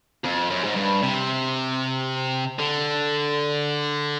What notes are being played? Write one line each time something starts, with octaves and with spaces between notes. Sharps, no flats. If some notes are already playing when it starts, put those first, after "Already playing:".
F2
F#2
G#2
G2
C3
D3